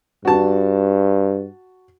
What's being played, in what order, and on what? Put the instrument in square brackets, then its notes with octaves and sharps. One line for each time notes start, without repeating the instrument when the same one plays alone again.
[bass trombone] G2 [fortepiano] F#4 A5